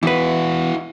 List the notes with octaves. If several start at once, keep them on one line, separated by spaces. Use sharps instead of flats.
E2 E4 F#4 B4